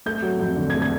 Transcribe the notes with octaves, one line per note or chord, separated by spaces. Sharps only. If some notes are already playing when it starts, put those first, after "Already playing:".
A3 G6
F#3
F2
D3
G#6
A3
G#6